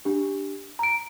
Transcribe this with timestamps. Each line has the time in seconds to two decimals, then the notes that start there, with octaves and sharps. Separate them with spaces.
0.05 D4 G4
0.79 A#5 D7